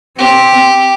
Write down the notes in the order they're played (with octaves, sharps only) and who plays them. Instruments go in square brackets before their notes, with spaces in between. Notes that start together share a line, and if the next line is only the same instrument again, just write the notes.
[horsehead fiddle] C4 [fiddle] G4